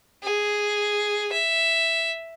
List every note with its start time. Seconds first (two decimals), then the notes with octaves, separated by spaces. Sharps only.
0.23 G#4
1.32 E5